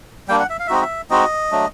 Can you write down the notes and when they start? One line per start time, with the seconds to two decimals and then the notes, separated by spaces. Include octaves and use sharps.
0.29 G3 A#3 D4 G5
0.39 F#5
0.50 E5
0.59 F5
0.67 E5
0.70 G#3 C4 D#4 F#4 D#5
0.81 E5
1.10 G#3 C4 D#4 F#4 D#5
1.51 F#3 A3 D4